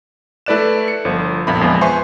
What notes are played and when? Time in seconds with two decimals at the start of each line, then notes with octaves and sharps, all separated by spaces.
0.46 A3 E4 B4 D5 F#6 E7
0.88 C#7
1.05 G1 F3 C5
1.47 G1 F2 A#2 E5 B5
1.61 E2 F3 G#3
1.81 B4 C5 E5 G#5 C6 C#6